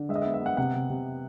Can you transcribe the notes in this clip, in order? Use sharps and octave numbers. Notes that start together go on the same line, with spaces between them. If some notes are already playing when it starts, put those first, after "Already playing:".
Already playing: D3
G#3 E5
D#5
E5
B3
E5
B3 F#5
C3 F#5
C3
C3